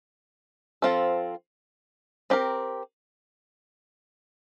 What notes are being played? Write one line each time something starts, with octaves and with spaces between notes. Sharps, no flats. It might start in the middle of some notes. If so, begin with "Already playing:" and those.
F3 C4 F4 A4
C4 G4 A#4